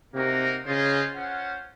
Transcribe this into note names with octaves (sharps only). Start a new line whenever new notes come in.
C3 A#3 D#4 F#4 A#4
C#3 C#4 F4 G#4 C5 D#5
C#4 F4 C5 F#5